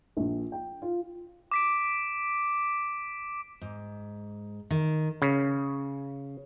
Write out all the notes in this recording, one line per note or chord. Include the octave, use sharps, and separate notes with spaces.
A#1
G5
F4
D6 B6 D7
G#2
D#3
C#3